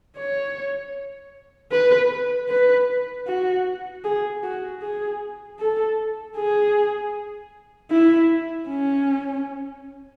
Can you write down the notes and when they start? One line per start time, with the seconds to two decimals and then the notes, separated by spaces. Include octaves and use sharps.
0.17 C#5
1.72 B4
2.50 B4
3.27 F#4
4.04 G#4
4.43 F#4
4.82 G#4
5.59 A4
6.37 G#4
7.91 E4
8.69 C#4